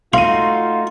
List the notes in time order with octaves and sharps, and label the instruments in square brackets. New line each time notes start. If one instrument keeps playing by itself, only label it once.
[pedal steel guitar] A3 D#4 F#4 [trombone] F4 [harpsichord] F5 [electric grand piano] C6 D#7